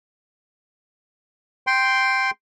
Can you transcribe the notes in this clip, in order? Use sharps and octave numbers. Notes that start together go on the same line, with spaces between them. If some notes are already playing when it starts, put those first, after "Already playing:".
G5 C6